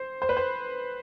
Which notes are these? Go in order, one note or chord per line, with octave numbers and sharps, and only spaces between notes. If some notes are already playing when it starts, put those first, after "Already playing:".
Already playing: C5
C5
B4
C5